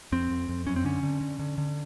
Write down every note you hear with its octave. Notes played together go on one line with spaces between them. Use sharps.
F2 C4
F2
F2
F#2 C#4
C4
D3 C#4
D3
D3
D3
D3